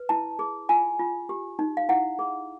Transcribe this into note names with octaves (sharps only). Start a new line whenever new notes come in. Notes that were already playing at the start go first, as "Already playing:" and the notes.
Already playing: B4
E4 A5
G#4
F4 G#5
F4
G4
D#4
F5
E4 F#5
G#4